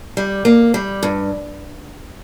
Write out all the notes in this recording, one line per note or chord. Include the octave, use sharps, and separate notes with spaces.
G3
A#3
G3
G2